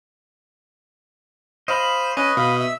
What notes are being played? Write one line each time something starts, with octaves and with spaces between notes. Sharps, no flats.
C5 D#5 F5 B5
C#4 B4 D#5
B2 F5 B5
E5 E6